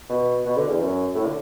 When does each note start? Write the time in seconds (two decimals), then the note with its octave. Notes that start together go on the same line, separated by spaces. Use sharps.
0.09 B2
0.45 B2
0.57 D3
0.68 E2
0.80 F#2
1.15 A2
1.26 D3